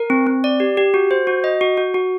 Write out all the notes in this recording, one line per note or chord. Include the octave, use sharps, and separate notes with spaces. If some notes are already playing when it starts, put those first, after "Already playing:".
Already playing: A#4
C4
C4
D5
G4
G4
F#4
C5
F#4
D#5
F#4
F#4
F#4